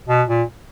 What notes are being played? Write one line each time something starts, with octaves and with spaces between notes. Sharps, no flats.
B2
A#2